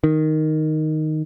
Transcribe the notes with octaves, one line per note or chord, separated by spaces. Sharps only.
D#3